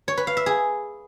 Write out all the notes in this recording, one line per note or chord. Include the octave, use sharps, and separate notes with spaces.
C#5
B4
F5
E5
G#4